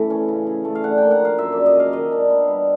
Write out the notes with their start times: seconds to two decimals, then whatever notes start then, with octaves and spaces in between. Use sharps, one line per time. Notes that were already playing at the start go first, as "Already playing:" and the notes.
Already playing: A2 C#3 E3 A3
0.10 C#4
0.28 C#3
0.47 C#3
0.65 A3
0.75 F5
0.83 D4 F#5
0.98 A#3 G5
1.11 F#5
1.20 F3
1.25 F5
1.38 F#2 E5
1.52 C#3 D5
1.66 D#5
1.75 A#3 F5
1.93 D#3 D#5
2.12 D4
2.30 B3
2.48 G3